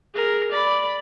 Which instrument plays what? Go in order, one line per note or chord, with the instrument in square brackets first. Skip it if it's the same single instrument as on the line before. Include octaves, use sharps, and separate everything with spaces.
[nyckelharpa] G#4 A#4
D5 B5